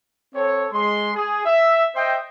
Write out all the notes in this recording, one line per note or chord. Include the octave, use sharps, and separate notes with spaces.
C4 A4 C#5
G#3 C6
G#4
E5
C5 D#5 E5 G5